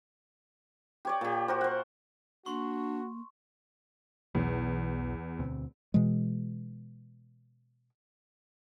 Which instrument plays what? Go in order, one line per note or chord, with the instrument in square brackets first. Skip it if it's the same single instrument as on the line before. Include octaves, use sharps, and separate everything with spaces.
[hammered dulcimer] G4 C#5 D5
A#2 G4
F#4 A#4 C5
C5 F#5
[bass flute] A#3 [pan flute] D4 [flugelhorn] F#4 [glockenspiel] C6 C#6
[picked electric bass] B1 B2 F#3 [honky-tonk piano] E2
[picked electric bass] D2 B2 C4
[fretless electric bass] B2 E3 G#3